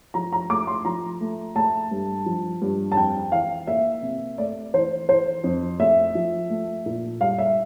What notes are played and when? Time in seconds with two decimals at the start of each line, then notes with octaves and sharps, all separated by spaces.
0.14 F3 A#5
0.33 A#5
0.50 A3 D6
0.67 C6
0.85 F3 A#5
1.20 A3
1.55 A3 A5
1.91 G2
2.26 F3
2.62 G2
2.92 A5
2.97 F2 G5
3.32 E3 F5
3.67 A#3 E5
4.03 C3
4.38 A3 D5
4.74 E3 C5
5.09 E3 C5
5.44 F2
5.79 A3 E5
6.15 F3
6.50 A3
6.86 A#2
7.21 G3 F5
7.38 E5